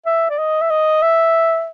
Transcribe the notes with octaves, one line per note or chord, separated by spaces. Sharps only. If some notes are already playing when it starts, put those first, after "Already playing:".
E5
D5
D#5
E5
D#5
E5